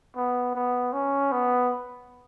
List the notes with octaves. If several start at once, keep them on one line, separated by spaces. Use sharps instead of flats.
B3
B3
C#4
B3